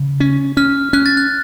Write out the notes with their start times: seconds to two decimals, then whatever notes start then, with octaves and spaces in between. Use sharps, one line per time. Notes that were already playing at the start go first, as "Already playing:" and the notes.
Already playing: C#3
0.20 C#4
0.57 C#4 F6
0.93 C#4 F#6
1.06 A6
1.17 F#6